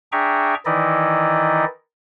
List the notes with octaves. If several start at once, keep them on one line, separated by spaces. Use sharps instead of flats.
D4 G#4 E5 G5 A#5 C#6
D#3 E3 D#4 E4 D5 D#5